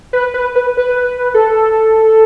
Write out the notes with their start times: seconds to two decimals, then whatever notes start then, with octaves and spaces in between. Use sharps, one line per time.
0.13 B4
0.34 B4
0.56 B4
0.77 B4
1.34 A4